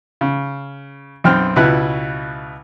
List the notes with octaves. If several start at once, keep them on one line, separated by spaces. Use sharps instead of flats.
C#3
B1 F#2 C4 G5 F6
C#2 B2 E4 B4 F#6